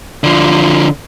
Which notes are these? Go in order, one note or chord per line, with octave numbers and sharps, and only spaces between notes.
D3 F3